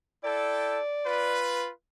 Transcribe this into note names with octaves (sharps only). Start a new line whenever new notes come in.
E4 A4 D5 G5
F4 B4